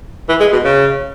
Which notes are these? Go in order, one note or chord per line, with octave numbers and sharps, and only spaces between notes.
E3
G#3
B2
C#3